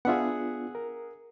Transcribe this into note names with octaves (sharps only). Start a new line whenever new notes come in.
B3 D4 F4 G#4 E5 F#5
A#4